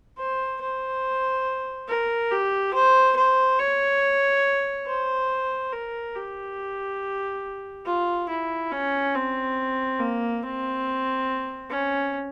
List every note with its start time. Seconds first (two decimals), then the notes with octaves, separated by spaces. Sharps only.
0.18 C5
0.61 C5
1.88 A#4
2.32 G4
2.74 C5
3.16 C5
3.59 C#5
4.87 C5
5.73 A#4
6.15 G4
7.85 F4
8.29 E4
8.72 C#4
9.15 C4
9.99 A#3
10.43 C4
11.70 C#4